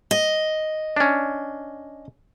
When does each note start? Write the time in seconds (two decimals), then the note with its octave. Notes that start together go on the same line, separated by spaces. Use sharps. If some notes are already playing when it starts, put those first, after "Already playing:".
0.11 D#5
0.96 C#4 D4